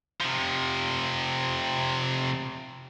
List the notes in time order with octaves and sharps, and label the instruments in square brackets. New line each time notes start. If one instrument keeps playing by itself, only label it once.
[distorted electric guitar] C3 F3